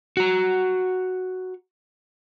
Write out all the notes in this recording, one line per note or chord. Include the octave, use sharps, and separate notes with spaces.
F#4 A#5